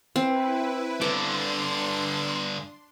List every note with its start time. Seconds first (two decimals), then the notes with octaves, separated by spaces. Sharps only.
0.16 C4 E4 B4
1.01 G2 D3 D4 C6 D6